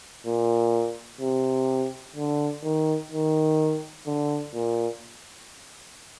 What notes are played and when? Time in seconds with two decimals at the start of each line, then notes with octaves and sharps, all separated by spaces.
0.26 A#2
1.21 C3
2.16 D3
2.63 D#3
3.12 D#3
4.06 D3
4.54 A#2